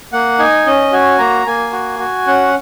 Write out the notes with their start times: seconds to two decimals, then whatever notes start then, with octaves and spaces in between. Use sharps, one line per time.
0.13 A#3 F#5
0.39 D#4 G#5
0.66 C#4 D#5
0.92 F#4 G#5
1.19 A#3 A#5
1.46 A#3 G#5
1.72 F#4
1.99 F#4
2.27 C#4 F#5